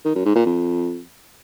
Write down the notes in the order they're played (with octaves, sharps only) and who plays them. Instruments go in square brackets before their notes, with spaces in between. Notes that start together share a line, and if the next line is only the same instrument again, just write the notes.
[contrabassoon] D#3
F#2
G#2
A#2
F2